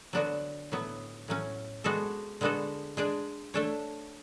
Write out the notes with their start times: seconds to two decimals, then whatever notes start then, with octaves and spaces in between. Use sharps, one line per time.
0.13 D3 F#3 B3 D4 F#4
0.72 A2 F#3 B3
1.28 A2 F#3 C#4
1.84 G#3 B3 F#4 A4
2.41 D3 G#3 B3 F#4 A4
2.97 G#3 D4 G#4 D5
3.54 A3 D4 A4 C#5